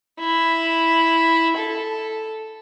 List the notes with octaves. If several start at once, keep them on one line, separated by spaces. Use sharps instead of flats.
E4
A4